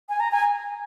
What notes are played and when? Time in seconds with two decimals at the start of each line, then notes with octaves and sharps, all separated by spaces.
0.09 G#5
0.20 A#5
0.32 G#5